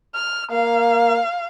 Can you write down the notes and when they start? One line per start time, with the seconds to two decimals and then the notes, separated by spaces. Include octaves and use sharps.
0.15 F6
0.51 A#3 F5